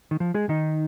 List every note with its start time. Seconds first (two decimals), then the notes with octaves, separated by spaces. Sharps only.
0.11 D#3
0.20 F3
0.34 G#3 G#4
0.49 D#3 D#4